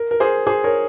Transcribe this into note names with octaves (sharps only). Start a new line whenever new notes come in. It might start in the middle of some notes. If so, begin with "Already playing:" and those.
Already playing: A#4
A#4
G#4 C5
G#4 C5
A#4 C#5